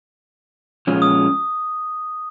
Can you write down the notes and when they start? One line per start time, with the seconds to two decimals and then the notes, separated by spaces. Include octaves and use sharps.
0.87 A#2 F3 G#3 C#4 F4
1.02 D#6